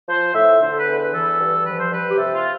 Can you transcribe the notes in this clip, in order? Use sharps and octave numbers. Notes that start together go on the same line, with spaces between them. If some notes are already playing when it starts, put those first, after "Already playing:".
F3 C5
A2 E5
D3 C5
A4
B4
E2
B4
E3 A4
G2
F3 B4
C5
G2 B4
G4
C3 A4
F4